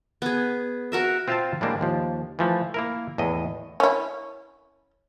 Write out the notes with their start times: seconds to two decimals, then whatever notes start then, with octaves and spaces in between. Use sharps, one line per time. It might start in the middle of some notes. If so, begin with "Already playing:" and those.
0.22 B3 G#4
0.92 F#4 A#4 E5
1.28 C4 F4 E5 F5 G5 A5
1.61 A2 G3 G#3 A#3 D4
1.81 D#2 F3
2.39 E3 F3 A3
2.74 A#3 E4 A#4
3.18 E2 A2 D#5
3.80 C#4 E4